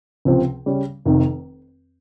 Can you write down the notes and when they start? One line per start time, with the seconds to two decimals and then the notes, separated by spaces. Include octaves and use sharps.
0.25 C#2 C3 F3 C4
0.66 C#3 G3 C#4
1.05 F1 F2 D#3